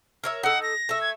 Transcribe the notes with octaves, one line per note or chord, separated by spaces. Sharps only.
A#4 C#5 E5
D#4 A4 F#5
A#6
A3 E5
G#6